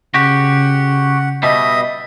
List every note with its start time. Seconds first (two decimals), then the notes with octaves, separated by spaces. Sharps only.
0.14 C#3 F#4 G4 F#5
1.43 B2 G3 D#5 E5 D#6